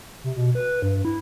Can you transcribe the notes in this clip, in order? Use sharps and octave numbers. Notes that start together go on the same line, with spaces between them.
C3
B2
B4
G2
E4